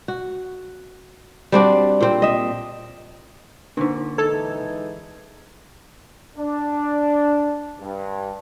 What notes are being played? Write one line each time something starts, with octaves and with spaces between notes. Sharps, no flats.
F#4
G3 C4 D4 F#4
A#2 C4 C5
D#5 E5
A#2 D3 D4 D#4
E3 G#3 D#4 A4 G#6
D4
G2